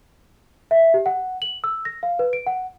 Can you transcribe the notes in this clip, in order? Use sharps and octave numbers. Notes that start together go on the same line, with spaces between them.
E5
G4
F#5
F#7
E6
A#6
F5
B4
D7
F#5